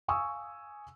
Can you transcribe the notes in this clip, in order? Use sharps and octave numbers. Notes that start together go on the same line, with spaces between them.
F5 G#5 C#6 D#6 E6